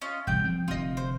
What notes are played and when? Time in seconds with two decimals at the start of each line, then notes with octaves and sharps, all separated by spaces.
0.01 C#4 F4 D#5
0.27 E1 C2 G2 G5 G6
0.44 F3 C4
0.68 F1 D3 C4 F4 D#5
0.97 C5